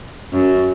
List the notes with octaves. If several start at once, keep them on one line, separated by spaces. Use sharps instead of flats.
F#2